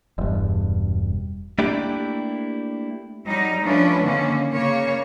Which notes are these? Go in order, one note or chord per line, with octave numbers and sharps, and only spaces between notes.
E1 G2
A3 A#3 D4 E4 G4
F#3 G3 D#4
F3 A3 C#4 D4 B4
D3 D#3 A#3 C#4
C#3 A#3 C#5